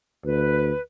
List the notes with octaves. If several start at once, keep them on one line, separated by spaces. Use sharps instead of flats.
D2 B4